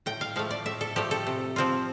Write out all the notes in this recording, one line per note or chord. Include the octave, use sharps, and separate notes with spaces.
A2 G5
F5
F3 A3 F5
D5
A2 E5
A4
F3 A3 G4
A4
C3
F3 C4 F4